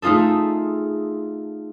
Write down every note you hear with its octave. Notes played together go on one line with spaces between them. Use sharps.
A3 D#4 F4 G#4 A4